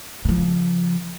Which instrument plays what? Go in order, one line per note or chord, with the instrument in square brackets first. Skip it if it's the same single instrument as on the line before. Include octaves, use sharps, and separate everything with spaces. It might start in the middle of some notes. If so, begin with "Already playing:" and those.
[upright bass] C#3 F3